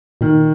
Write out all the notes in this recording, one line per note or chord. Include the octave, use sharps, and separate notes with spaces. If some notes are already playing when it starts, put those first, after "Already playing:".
A#2 D#3